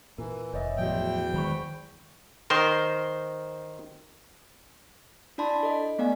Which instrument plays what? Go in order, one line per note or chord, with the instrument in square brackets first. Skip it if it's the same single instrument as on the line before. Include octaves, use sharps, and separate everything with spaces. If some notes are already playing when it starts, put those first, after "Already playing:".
[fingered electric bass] A#2 [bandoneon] E3 [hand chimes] A#4
[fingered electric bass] F1 [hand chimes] C#5 D#5 E5
[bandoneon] E2 G5 [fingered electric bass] A2 F3 F#3 [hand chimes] F#4 E5
[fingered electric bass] D#3 F#3 G#3 [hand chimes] C5 B5 C#6
[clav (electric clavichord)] D#3 A#4 [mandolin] C5
[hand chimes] D4 E4 D5 A5 B5 C6
A4 D#5
A3 B3 D5 F5 G#5